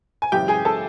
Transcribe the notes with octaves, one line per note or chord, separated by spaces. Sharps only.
G#5
F#2 C#3 E3 G#3 G4 G5
G#4 G#5
A4 A5